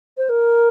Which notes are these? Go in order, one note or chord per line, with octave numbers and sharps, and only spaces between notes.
C5
A#4